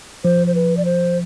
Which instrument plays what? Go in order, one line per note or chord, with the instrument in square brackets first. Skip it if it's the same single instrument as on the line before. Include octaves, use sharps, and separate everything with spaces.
[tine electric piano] F3 [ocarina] C5
[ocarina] C5
B4
D5
C5